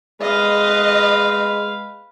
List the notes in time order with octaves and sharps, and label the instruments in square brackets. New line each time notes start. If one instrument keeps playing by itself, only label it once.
[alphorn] G#3 [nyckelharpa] B4 F5 [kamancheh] D#5